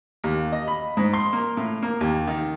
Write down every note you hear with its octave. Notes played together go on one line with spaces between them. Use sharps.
D#2
D#5
B5
G#2
C6
A#3
A2
A#3
D#2
D#3